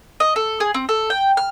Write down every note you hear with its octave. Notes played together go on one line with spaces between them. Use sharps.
D#5
A4
G#4
C4
A4
G5
F6